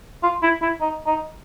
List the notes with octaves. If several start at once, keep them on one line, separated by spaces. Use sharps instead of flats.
F4
E4
E4
D#4
D#4